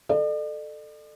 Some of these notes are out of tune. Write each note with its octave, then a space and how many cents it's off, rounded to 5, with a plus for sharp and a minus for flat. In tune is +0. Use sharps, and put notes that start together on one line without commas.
A4 +0 D5 +45